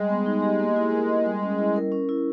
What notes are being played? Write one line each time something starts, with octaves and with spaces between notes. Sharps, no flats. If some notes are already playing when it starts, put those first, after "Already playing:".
Already playing: G3 G#3
B3
D#4
G4
A#3
E4
A#4
D#5
G3
C#4
E4
A#4
C#4
E4